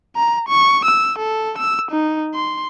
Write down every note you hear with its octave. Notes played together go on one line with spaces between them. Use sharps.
A#5
C#6
E6
A4
E6
D#4
C6